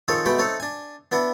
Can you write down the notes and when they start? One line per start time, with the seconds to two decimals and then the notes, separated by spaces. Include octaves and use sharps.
0.08 D#3 F3 C4 G#4 A4 C#5
0.25 B2 G#3 A3 F#4 G5 B5
0.39 A3 C4 D#4 A4 C#5
0.60 D4 G#5
1.12 B3 D4 E4 F#5